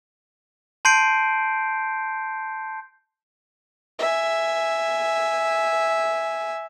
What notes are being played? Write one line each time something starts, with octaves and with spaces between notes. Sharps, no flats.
A5 C6 G6 C7 D7
E5 G#5